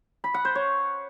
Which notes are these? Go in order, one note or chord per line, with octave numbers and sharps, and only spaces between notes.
B5
F#5
C5
C#5